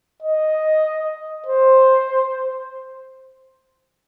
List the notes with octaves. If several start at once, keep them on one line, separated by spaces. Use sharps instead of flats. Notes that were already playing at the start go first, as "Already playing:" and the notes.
D#5
C5